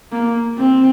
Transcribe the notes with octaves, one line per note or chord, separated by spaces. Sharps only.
A#3
C4